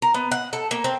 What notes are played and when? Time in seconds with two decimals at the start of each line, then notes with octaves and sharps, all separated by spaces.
0.02 A#4
0.14 B3
0.31 F#5
0.53 A4
0.71 A#3
0.84 C4